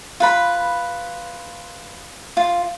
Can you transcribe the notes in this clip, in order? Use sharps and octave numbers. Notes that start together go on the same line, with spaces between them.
F4 B4 B5
F4